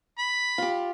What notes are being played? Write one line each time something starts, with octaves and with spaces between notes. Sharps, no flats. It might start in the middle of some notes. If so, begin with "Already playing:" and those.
B5
F4 G4